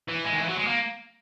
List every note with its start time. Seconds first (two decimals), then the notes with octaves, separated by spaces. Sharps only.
0.09 E3
0.25 G#3
0.33 D#3
0.41 E3
0.49 F#3
0.57 G#3
0.67 A#3